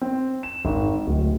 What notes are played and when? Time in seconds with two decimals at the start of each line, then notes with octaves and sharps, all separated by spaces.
0.01 C4
0.43 E7
0.65 G#1
1.07 D1